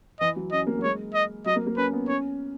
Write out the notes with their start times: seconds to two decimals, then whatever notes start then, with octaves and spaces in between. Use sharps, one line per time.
0.20 E3 D#5
0.36 F#3
0.52 C#4 D#5
0.67 A#3
0.78 F#3
0.83 G#3 C#5
1.14 D#5
1.46 F#3 D#5
1.56 A#3
1.67 A#3
1.77 C#4 B4
1.93 B3
2.08 C#4 C#5